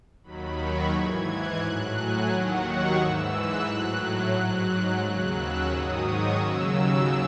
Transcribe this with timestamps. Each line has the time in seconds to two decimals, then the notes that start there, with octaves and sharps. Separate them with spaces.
0.23 D#2 D#3 F#3 B5
0.58 C#6
0.92 G#2 E3 G#6
1.26 F#6
1.60 A2 F#3 F#6
1.93 G#5
2.28 D#2 D#3 F#3 F#5
2.62 C#6
2.95 G#2 E3 E6
3.30 F#6
3.63 A2 F#3
4.32 G#2 F#3
4.99 D#2 C#3 F#3 F#6
5.34 E6
5.68 G#2 D#3 F#3 D#6
6.02 C#6
6.35 D#2 C#3 F#3 E6